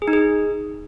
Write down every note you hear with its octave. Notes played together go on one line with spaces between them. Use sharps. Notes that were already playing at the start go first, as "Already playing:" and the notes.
G#4
D#4
G#4